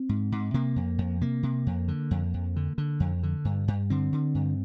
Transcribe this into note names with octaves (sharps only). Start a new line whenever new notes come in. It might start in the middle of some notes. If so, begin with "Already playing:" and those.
Already playing: C4
G#2
G#2
C3 A#3
F2
F2
C3 A#3
C3
F2
D3
F2
F2
D3
D3
F2
D3
G2
G2
D3 C4
D3
G2